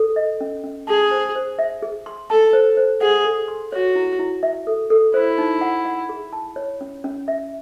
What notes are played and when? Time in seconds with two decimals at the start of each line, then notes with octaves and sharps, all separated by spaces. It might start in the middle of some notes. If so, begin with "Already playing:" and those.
Already playing: A4
0.16 D#5
0.41 C#4
0.64 C#4
0.87 G#4 A5
1.11 C5
1.35 C5
1.59 E5
1.82 G#4
2.06 C6
2.30 A4 A5
2.53 C5
2.77 C5
3.01 G#4 F#5
3.25 A4
3.48 C6
3.72 F#4 C#5
3.96 E4
4.19 E4
4.43 E5
4.67 A4
4.90 A4
5.14 E4 C5
5.38 D#4
5.61 F#5
5.85 F#5
6.09 G#4
6.33 A5
6.56 C#5
6.81 C#4
7.04 C#4
7.28 E5